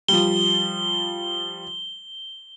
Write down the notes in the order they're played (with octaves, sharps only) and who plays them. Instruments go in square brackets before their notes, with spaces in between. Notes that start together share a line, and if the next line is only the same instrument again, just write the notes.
[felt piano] F3 G3 [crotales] G7